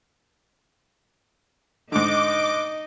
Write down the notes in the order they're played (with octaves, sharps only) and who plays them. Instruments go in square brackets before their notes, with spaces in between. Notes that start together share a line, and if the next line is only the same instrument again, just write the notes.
[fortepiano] G#2 D3 [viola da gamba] D#4 D#5 [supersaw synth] D6